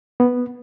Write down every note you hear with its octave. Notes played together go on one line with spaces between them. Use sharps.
B3